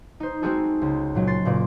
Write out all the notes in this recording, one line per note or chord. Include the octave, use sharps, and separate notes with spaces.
D#4 C5
G#3 C4 D#4 F#4 G#4 A4
C#2
A#2 F#3 G#3
C#4 C6 A6 C7
F#1 A#2 D5